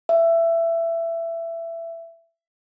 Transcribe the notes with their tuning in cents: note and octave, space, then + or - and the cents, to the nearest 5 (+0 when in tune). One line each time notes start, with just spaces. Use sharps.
E5 +20